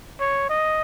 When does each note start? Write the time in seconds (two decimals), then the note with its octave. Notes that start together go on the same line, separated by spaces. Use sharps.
0.20 C#5
0.50 D#5